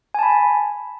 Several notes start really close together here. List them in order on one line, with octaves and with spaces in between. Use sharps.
G#5 A5 B5